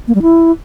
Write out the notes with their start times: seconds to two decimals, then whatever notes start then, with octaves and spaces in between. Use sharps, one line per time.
0.08 A#3
0.15 G3
0.22 E4